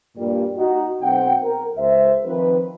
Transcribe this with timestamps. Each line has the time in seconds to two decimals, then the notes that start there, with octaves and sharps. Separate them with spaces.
0.17 G2 A#2 G3 A#3
0.57 D#4 F#4
1.02 B1 C4 F#5 G5
1.43 A#4
1.78 C#2 C5 E5
2.25 D#3 F3 C4 B4